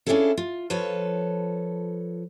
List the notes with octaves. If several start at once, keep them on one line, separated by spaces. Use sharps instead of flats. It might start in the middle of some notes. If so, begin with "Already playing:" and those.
C#4 D4 E4 F4 G#4 A4
F4
F3 F4 A4 B4 C#5